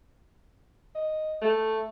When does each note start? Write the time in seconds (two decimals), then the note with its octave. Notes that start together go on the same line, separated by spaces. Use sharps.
0.95 D#5
1.42 A3